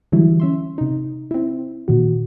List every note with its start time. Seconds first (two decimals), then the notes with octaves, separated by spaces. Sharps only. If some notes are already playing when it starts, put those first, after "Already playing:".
0.12 D3 E3 F#3 G3 E4
0.40 C#4 E5 C6
0.78 C3 D#4
1.31 C4 E4
1.88 A#2 D#3 F#4